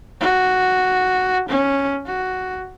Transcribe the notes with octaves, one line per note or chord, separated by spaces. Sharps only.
F#4
C#4
F#4